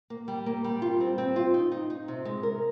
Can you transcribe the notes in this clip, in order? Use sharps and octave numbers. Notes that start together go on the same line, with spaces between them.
A#3
G3
A#3
G3
F4
C4
C4
F4
D#4
D#4
D#4
C3
G#3
A#4